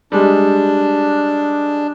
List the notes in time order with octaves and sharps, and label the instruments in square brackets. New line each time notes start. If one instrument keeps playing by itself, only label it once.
[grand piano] G3 G#3 [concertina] D4